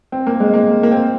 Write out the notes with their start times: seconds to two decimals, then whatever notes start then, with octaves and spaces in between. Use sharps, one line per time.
0.12 C4
0.27 A#3
0.40 G#3
0.54 A#3
0.83 A#3
0.92 C4